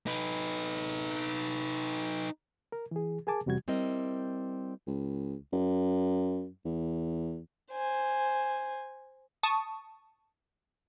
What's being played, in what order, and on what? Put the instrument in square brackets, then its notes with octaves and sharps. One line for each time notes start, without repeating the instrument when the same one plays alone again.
[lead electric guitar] D#4 B4
[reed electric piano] A#4
E3 G#4
G#4 A#4 G#5 A5 D6
E2 C3 G3 F#4 G#6
[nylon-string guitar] G3 C4 E4 A#4 D#5
[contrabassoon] C#2
F#2
E2
[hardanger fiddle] C5 G#5
[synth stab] A5 C#6 D#6